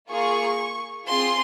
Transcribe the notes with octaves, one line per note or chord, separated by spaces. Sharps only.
A#3 F4 G#4 C#6
C4 F4 G#4 C6